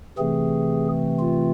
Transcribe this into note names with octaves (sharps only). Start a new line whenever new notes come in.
C3 E3 A3 C4 G#4
F4